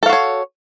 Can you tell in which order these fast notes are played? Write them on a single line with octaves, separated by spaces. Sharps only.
A4 F5 F#4 C#5